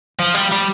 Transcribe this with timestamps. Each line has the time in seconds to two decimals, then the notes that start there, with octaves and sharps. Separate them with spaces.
0.19 F3
0.34 G3
0.51 G3